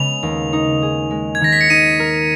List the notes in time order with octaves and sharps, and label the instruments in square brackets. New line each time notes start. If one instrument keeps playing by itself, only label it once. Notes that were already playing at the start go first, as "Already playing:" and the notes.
Already playing: [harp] C#3 G#3 B3 [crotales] F7
[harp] D#2
D#4
G#4
G#3
[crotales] G#6
[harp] D#3 [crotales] A#6
[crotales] B6
C#7
[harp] D#4 [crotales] D#7
[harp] A#4